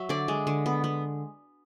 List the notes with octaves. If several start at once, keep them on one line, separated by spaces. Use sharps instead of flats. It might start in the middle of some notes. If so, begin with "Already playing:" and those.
Already playing: F#3 E5
D3 D5
G#3
D3
B3
B3